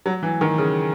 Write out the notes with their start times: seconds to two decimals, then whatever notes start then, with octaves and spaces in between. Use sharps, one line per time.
0.06 F#3
0.23 E3
0.41 D#3
0.58 C#3